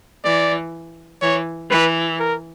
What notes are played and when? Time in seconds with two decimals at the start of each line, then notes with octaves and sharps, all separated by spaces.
0.25 E3 D5
1.22 E3 C#5
1.70 E3 B4
2.20 A#4